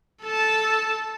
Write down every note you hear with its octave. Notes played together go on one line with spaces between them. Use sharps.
A4 A5